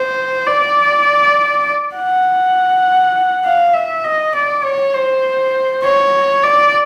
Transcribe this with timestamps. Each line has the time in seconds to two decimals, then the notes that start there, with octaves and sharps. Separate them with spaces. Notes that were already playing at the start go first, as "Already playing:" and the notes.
Already playing: C5
0.46 D5
1.95 F#5
3.45 F5
3.74 E5
4.04 D#5
4.35 D5
4.64 C#5
4.94 C5
5.83 C#5
6.43 D5